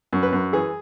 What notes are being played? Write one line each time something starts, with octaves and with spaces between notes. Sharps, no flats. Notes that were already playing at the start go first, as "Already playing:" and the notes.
F#2
B4
F#2
E3 G#4